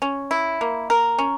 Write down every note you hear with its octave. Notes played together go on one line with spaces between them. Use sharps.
C#4
E4
A#3
A#4
C#4